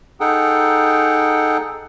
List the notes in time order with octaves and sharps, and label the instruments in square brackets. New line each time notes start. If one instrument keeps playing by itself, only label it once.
[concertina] D#4 G#4 A4 F#5 G5